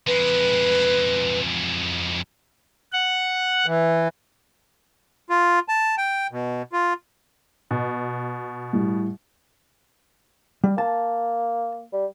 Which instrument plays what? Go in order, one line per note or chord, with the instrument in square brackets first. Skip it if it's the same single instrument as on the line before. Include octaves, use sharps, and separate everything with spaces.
[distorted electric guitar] F2 G#3 [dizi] B4
[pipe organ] F#5
[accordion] E3
F4
A5
G5
B2
F4
[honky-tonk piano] B2
[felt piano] A2 G3
[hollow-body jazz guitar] G3
[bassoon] A#3 [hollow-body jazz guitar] A5
[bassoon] G3